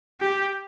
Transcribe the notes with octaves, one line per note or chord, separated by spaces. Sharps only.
G4